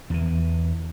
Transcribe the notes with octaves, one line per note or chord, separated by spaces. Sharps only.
E2 E3